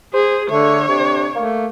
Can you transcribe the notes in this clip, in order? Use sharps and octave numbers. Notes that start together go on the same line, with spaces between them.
G#4 C5
D3 A3 C#5
C3 D4
A3 A#3